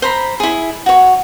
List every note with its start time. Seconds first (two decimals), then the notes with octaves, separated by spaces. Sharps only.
0.02 C5 A#5 B5
0.40 E4 G#4
0.86 F#4 C#5